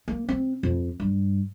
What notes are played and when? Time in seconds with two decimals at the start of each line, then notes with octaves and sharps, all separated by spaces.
0.08 A#3
0.28 C4
0.63 F2
1.00 G2